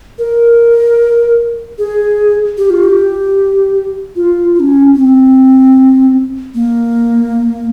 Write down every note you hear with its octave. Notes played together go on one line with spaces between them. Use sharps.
A#4
G#4
G4
F4
G4
F4
F4
C#4
C4
A#3